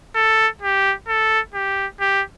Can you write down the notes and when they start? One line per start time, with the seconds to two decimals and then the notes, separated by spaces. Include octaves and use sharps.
0.15 A4
0.62 G4
1.08 A4
1.54 G4
2.00 G4